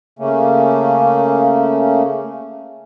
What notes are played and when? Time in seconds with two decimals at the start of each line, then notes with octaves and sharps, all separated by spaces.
0.19 C#3 A3 A#3 C#4